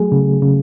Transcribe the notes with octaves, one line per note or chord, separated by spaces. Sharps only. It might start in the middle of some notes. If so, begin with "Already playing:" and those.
Already playing: F#3 A3 G#4
C#3
C#3